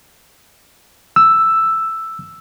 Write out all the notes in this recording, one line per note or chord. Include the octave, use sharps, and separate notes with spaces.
E6